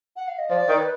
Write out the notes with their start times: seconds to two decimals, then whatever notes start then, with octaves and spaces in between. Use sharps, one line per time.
0.16 F#5
0.28 F5
0.38 D#5
0.49 F3 D5
0.68 D#3
0.78 B4